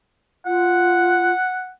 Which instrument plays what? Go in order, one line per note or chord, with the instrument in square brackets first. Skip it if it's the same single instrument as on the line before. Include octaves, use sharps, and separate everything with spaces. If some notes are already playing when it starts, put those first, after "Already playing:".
[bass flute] F4 [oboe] F#5